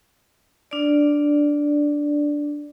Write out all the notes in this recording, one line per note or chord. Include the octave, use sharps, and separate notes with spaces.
D4 D5